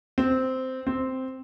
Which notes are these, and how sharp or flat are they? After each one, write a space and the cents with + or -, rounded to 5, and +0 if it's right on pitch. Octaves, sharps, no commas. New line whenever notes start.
C4 -10
C4 -5